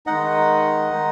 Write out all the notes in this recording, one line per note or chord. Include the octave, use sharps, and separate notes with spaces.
D#3 G#3 D#4 D#5 F#5
D#3 G#3 D#4